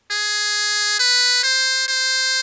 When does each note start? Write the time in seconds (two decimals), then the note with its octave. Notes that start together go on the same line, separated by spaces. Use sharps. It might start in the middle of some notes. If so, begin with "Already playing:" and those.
0.11 G#4
1.00 B4
1.43 C5
1.88 C5